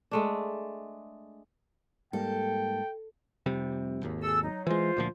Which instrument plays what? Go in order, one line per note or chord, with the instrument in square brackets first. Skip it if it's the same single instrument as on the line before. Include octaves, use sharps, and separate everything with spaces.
[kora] G#3 A3 D4
[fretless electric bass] G#2 G3 A#3 [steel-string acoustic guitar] A4 [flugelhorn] G5
[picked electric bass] F1 C3 G3
G#1 D#2
[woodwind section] G#4 A4 E6
F#3 D#4
[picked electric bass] E3 G#3 [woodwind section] F4 C5
[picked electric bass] D2 A#2 F3